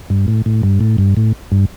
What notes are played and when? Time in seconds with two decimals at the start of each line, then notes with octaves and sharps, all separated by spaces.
0.10 G2
0.28 A2
0.46 A2
0.63 G2
0.81 A2
0.98 G2
1.17 A2
1.52 G2